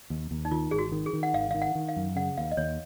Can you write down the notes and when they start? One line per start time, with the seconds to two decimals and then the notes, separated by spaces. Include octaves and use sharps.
0.10 D#2
0.31 D#2
0.45 D#4
0.51 D#3 F4
0.71 G#1 G#4
0.79 F#4
0.92 D#3
1.06 G#4
1.13 D#3
1.23 F#5
1.33 G#1 F5
1.51 D#3 F5
1.62 F#5
1.75 D#3
1.89 F5
1.96 F#2
2.16 C#3 F#5
2.37 D#2 F5
2.51 D#5
2.57 D#2 C#5